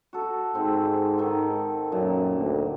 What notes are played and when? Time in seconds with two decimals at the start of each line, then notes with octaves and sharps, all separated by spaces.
0.13 F#4 A4
0.55 G#2 C4
1.18 D#3 A4
1.92 F#2 A#2
2.36 D2